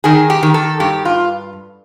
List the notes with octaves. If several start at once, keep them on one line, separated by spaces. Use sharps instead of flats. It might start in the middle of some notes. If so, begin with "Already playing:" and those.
D#3 G#4
G4
D#3
A4
G2 G4
F4